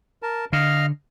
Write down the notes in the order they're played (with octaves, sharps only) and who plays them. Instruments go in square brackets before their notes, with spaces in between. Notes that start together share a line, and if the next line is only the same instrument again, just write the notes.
[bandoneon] A#4 A5
[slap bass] D3 [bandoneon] D#5 F5 F6